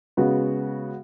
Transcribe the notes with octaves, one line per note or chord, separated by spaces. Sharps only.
C#3 G#3 B3 F#4